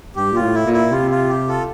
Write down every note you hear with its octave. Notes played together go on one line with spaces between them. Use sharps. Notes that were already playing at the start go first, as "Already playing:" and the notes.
G2 G4
A#2 F4
A2
E4
A#2
E4
C3 F4
F4
G4
F4 A4